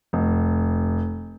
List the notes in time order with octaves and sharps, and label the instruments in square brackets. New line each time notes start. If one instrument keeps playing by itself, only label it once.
[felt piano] F1